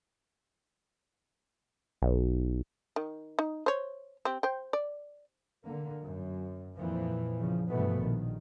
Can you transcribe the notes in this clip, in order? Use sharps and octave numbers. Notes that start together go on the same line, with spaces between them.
B1
D#3
D#4
C5 C#5
C4 G4
C5 G5
D5
D3 A#3
F#2
F2 A#2 E3 F3
E2 C#3 F3
G2 B2 E3 F3 A3 B3
A#1 D#3